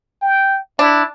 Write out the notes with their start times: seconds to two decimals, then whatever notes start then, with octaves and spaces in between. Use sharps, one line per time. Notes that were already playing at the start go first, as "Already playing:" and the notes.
0.22 G5
0.79 D4 E4